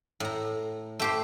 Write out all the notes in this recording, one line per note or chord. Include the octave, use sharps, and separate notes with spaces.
A2 A#5
A3 G4 C5